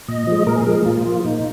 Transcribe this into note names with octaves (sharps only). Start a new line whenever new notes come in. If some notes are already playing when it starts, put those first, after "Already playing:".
A#2 D#5
F3 G#3
A#2 A#4
G#4
F3 G#3 A#4
G#4
A#2 F4
F3 A#3
A#2 D#4